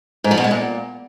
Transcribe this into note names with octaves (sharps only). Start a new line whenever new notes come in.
G#2
F3
B2
G#3
A#2